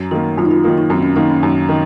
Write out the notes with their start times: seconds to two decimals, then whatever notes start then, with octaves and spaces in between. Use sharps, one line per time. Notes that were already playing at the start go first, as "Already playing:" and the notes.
Already playing: F#2
0.11 D#3 A#3 F#4
0.38 F#2 F4
0.45 D#4
0.51 F4
0.64 D#3 A#3 F4
0.78 D#4
0.90 F#2 C4
1.02 C#4
1.16 D#3 A#3 D#4
1.30 C#4
1.42 F#2 D#4
1.69 D#3